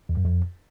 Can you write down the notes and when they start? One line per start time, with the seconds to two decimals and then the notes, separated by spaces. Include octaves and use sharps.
0.09 E2
0.17 F#2
0.25 F2